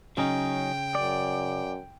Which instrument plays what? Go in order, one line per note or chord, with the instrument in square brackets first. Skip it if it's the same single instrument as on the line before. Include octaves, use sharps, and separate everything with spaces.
[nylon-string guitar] C#3 [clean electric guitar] F#3 C#4 D#4 [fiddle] G5
[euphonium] F#2 [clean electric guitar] D5